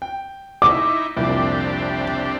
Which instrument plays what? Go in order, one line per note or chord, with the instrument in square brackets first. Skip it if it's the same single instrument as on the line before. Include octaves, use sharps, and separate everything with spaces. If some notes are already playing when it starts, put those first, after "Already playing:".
[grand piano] G5
[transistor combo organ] D#4 E4 [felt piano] D6
[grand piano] C2 F2 A#2 [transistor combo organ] C4 D4 G4